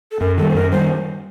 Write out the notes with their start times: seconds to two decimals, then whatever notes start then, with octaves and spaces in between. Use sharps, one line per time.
0.12 A4
0.20 F#2 A#4
0.37 D#3 G3 A4
0.50 C5
0.55 F#2 A#4
0.72 D#3 G3 C5